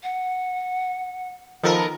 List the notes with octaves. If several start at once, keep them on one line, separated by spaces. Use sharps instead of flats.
F#5
D#3 F3 B3 A4 A#4